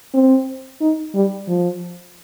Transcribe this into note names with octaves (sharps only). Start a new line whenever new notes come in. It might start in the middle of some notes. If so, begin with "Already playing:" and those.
C4
D#4
G3
F3